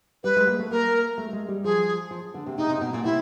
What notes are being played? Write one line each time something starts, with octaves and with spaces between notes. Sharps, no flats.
G3 B4
G#3
A#3
A3
A#3 A#4
A3
A3
G#3
G3
F3 G#4
F3
D3
C3
C3 D#4
C3
B2
A#2
C3 E4